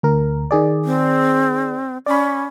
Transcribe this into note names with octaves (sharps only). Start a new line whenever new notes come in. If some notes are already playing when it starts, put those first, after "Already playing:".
D2 A#4
D#3 G#4 D5
C4
C#4 D5 B5